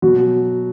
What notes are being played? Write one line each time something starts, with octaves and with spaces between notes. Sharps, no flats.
B2 F#3 F#4